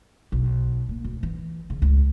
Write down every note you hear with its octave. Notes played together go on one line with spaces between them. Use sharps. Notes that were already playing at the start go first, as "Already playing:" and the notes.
B1
A#3
D2
E3
C#3
C#2